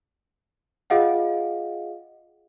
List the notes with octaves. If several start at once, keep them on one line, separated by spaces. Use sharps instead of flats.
F4 G#4 D#5 F5 F#5